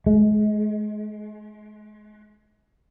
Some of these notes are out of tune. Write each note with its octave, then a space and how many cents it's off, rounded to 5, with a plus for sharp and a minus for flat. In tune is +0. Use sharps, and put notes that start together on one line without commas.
G#3 +35